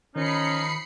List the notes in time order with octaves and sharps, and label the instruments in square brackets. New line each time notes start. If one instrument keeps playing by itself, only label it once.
[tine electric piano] D#3 [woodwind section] F3 D#4 [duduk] C#4 [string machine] B5 C7 C#7